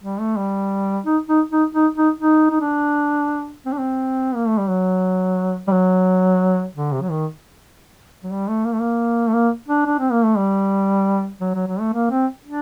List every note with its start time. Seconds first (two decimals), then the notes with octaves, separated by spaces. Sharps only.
0.03 G3
0.20 A3
0.37 G3
1.06 D#4
1.29 D#4
1.52 D#4
1.75 D#4
1.97 D#4
2.20 D#4
2.50 D#4
2.61 D4
3.65 C4
3.72 D4
3.78 C4
4.35 A#3
4.47 A3
4.58 G3
4.69 F#3
5.67 G3
5.72 F#3
6.76 D3
6.92 C3
7.01 F#3
7.10 D#3
8.23 F#3
8.31 G3
8.48 A3
8.65 A#3
8.73 A3
8.79 A#3
9.27 A3
9.33 A#3
9.68 D4
9.86 D4
9.99 C4
10.11 A#3
10.24 A3
10.37 G3
11.41 F#3
11.54 F#3
11.67 F#3
11.80 A3
11.93 A#3
12.11 C4
12.45 D4